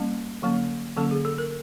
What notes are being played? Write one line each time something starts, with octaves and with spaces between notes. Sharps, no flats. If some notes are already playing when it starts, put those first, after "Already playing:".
Already playing: G3 A#3 C#4
D3 F#3 A#3 C#4
D3 F#3 A#3 C#4 A4
G#4
A4
A#4